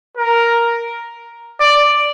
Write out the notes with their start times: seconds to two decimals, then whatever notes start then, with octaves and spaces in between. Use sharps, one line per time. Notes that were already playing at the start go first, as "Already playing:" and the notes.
0.17 A#4
1.60 D5